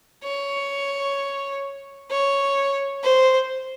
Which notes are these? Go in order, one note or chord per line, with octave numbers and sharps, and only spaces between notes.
C#5
C#5
C5